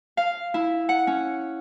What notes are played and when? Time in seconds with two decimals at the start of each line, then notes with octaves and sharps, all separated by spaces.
0.17 F5
0.54 E4
0.89 F#5
1.07 C#4